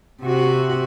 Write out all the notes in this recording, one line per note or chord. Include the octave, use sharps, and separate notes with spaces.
C3 F#4